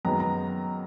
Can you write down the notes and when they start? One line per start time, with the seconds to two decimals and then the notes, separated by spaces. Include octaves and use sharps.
0.05 F#2 D#3 G#3 B3 A#5
0.20 A#5